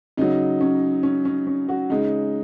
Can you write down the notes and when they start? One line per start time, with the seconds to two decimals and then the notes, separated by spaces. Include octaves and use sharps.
0.17 C#3 F#3 D#4
0.61 C#4
1.03 C#4
1.25 C#4
1.47 C#4
1.69 F#4
1.90 C#3 G#3 D#4